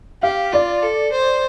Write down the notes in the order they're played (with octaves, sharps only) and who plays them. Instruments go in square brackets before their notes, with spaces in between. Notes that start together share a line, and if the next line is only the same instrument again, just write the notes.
[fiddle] G4 [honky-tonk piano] F5
[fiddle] F4 [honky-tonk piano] D5
[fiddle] A4
C5